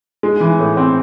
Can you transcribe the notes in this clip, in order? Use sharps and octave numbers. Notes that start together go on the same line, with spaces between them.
G#3
E3
A2
C4